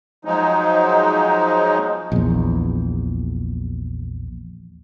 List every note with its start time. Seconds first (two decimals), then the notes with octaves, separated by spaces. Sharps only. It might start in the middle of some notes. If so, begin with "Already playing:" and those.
0.25 F3 F#3 G#3 D#4
2.12 A#1 E2